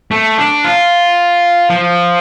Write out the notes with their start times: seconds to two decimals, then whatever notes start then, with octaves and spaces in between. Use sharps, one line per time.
0.11 A3
0.38 D4
0.64 F4
1.70 F3